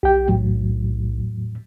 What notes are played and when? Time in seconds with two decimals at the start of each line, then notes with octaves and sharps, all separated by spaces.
0.03 B1 G4 G5
0.28 E2 A2 F#3